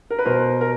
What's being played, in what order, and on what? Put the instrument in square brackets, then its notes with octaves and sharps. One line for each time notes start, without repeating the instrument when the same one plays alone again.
[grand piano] A#4
B4
B2 A#4 C5
A#4